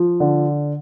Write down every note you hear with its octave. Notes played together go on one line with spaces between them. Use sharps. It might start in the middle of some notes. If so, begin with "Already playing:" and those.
Already playing: F3
D3